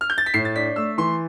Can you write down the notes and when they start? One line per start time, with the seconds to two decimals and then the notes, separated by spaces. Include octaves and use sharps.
0.01 F6
0.10 G6
0.18 A6
0.26 B6
0.34 A2 C7
0.45 A6
0.55 D4 B6
0.76 A3 E6
0.98 E3 C6